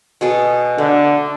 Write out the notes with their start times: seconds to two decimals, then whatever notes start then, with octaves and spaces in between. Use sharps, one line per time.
0.21 B2 G#4 A4
0.78 D3 A3